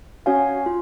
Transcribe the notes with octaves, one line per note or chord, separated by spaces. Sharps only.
C#4 F#4 C#5 F5 G#5
F4